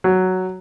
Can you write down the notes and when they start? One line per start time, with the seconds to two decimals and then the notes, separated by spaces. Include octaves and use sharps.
0.04 F#3